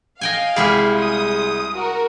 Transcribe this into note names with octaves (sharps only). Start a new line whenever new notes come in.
D#5 F5 G5 G#5
C2 G3 G#3 E4 G#4 F6
D#6
F#4 A#4